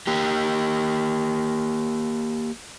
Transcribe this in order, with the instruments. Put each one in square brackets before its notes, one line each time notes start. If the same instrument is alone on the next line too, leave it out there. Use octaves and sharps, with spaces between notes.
[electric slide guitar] A#3 G4